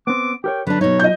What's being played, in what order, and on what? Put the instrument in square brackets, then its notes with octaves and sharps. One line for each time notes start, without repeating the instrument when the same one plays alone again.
[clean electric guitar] B3 C4 [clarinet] D6
[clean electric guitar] G4 A#4 C#5 [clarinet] G5
[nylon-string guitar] D3 D4 [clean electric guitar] F#3 [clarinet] B4
[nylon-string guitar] B2 D#4 [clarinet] C#5
[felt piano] D#5 G6